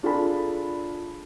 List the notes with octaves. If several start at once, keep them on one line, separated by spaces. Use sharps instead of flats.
D4 F4 G#4 A4 B5